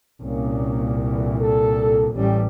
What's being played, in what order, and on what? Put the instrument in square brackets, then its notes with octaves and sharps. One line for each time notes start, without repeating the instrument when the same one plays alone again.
[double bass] C2 A#2 [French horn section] A#3 C#4
[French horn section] D3 E3
A4
[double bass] A1 G3 [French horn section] C#4 G4